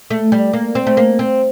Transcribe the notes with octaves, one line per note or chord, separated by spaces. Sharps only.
A3
G3
A#3
C4
A3
A#3
C4